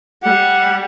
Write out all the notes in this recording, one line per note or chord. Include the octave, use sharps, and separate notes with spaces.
G3 F#5